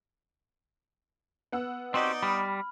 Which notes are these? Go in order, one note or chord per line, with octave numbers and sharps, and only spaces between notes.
B3 F#5 E6
C4 D#4 F#4 G4 D5 D#5
G3 B5 F6